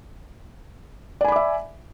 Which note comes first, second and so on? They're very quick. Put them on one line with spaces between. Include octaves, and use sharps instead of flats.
D5 G#5 B5 D6 E5